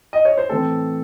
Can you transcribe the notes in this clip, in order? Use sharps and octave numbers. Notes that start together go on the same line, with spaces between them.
D#5
C#5
C5
A2 E3 C4 A4